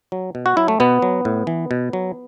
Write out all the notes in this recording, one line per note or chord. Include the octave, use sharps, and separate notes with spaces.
F#3
B2
F#4
F#3 E4
A3
B2 B3
F#3
A2
E3
B2
F#3